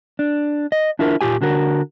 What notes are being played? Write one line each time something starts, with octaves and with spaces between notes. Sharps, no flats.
D4
D#5
D4 E4 F4 A#4
A#2 F4 G4 G#5
D3 F#4 A#4